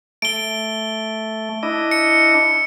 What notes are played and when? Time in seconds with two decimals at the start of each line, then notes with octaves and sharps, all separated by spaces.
0.22 A3 D7 G7
1.63 D4 E4 D#5
1.91 C#7